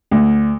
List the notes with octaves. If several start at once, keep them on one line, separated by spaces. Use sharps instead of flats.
D2